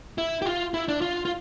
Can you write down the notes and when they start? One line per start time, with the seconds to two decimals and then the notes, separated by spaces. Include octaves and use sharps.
0.18 E4
0.42 G4
0.46 F4
0.74 E4
0.88 D4
1.01 F4
1.25 F4